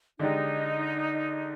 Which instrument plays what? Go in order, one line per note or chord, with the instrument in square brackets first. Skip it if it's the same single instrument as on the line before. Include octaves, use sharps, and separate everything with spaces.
[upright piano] D3 G#3 D4 G4 [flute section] D#4